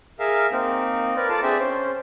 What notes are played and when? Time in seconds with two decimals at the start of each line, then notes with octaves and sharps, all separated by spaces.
0.20 G#4 A#4 E5 F5
0.52 A#3 C4 D#4
1.16 A#4 B4 D5
1.29 F4 A4 D5 F5 A5 D6
1.43 C4 D4 G#4 D5 E5 G5
1.59 C#4 C5